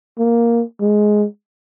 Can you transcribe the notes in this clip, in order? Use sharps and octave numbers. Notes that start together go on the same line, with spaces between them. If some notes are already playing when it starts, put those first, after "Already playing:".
A#3
G#3